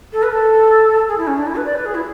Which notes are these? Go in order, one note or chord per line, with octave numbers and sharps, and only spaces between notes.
A4
B4
A4
G#4
E4
C#4
D4
E4
B4
D5
B4
G#4
E4